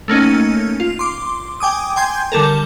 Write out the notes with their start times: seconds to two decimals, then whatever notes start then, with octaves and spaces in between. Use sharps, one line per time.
0.08 A3 A#3 C#4 D#4
0.80 F4
0.99 C6 D6
1.60 G5 G#5 D6 D#6
1.96 G5 G#5 C6 G6 G#6
2.32 D3 G3 A4 A#4